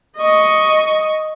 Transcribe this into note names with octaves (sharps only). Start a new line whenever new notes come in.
D#5 C#6